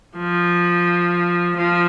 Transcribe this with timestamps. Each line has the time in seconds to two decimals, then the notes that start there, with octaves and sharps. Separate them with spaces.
0.18 F3
1.57 F3